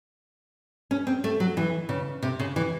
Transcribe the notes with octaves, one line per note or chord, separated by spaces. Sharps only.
C#4
C4
A3
F#3
E3
C#3
C3
C#3
E3